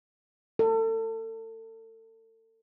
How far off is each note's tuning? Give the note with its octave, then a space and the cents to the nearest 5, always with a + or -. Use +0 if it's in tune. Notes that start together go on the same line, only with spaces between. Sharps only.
A4 +35